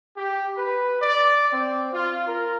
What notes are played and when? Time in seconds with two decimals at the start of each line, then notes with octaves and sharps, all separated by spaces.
0.17 G4
0.57 B4
1.02 D5
1.53 C4
1.93 F4
2.28 A#4